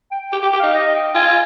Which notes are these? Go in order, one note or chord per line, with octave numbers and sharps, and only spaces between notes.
G5
G4 G5
G4
G5
G4
D#4 F5
D#5
G5
F4 G#5